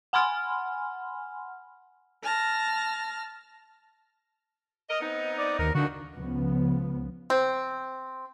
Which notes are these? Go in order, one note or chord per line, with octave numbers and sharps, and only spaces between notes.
F#5 G#5 B5 C6 F6
A5 F6 A#6
A#4 D#5
B3 C4 D#4
D5
D#2 A#4
D3 D#3 F3 F#4
C#2 C#3 F3 B3
C4